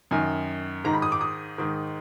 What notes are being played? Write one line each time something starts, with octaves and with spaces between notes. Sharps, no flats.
F#2 D#3 G#5
G#2 D#3 A#5
B5
D#6
D6
D#6
G#2 D#3